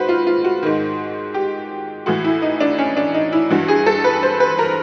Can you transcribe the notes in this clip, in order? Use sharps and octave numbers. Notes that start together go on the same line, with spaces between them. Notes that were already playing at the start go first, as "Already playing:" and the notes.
Already playing: G#2 F#4 B4 C5
F4
F4
F#4
G#2 D#3
G4
A2 E3 F#4
E4
D#4
D4
C#4
D4
D#4
E4
G2 E3 F#4
G#4
A4
B4
C5
B4
A#4